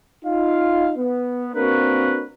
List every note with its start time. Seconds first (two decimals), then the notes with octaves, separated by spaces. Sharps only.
0.25 D#4 F4 F5
0.97 B3
1.54 A#3 C4 D4 F#4 A#4 B4